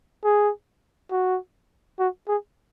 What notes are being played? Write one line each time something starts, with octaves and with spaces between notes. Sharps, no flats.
G#4
F#4
F#4
G#4